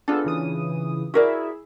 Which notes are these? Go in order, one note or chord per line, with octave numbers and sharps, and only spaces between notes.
B3 D4 F4 G#4 A4
C#3 E3 D#6
E4 F#4 G#4 A#4 D5 E5